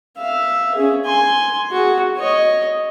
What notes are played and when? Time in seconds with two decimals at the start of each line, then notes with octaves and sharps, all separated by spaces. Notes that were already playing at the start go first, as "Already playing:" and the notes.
0.18 E5 F5
0.75 C#4 G#4
1.04 G#5 C6
1.72 F#4 G#4
2.17 C#5 D#5